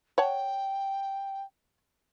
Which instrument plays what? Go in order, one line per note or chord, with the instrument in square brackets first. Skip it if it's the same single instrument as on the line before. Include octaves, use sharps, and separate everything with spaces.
[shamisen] C#5 F#5 A5 [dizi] G5